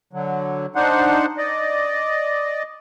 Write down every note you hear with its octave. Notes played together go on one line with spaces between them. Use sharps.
D3 F#3
D4 D#4 C5 F#5
D5 D#5